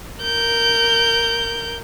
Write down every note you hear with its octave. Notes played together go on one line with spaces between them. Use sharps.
A#4 G6